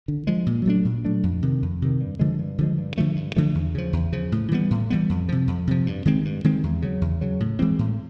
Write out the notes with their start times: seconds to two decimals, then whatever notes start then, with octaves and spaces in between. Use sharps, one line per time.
0.08 D3
0.27 F3 G#3
0.46 A#2
0.65 F#3 A3 D4
0.85 A#2
1.05 F#3 A3 D4
1.23 F2
1.42 C3 D#3
1.62 F2
1.82 C3 D#3
2.01 G2
2.19 D3 F3 G#3
2.39 G2
2.58 D3 F3 G#3
2.78 G2
2.98 D3 F3 A3
3.16 G2
3.36 D3 F3 A3
3.55 E2
3.75 C#3 F3
3.93 E2
4.12 C#3 F3
4.32 A2
4.52 E3 G3 B3
4.71 A2
4.90 E3 G3 B3
5.10 F2
5.29 C3 F3
5.47 F2
5.67 C3 F3
5.86 G2
6.05 D#3 G#3 C4
6.25 G2
6.44 D#3 G#3 C4
6.63 E2
6.82 C#3 F#3
7.01 E2
7.21 C#3 F#3
7.40 A2
7.59 E3 G#3 C4
7.79 A2